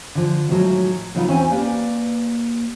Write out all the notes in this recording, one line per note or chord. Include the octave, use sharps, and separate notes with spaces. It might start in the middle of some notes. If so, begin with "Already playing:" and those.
D3 F3
A2 D#3 F3 F#3 G#3
C#3 F#3 B3 D#4 F4 A#4
E2 C4 C#4 C5 G5 G#5
A#3 G4 B4 D5